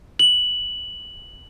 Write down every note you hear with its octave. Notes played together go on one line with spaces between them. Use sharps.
F#7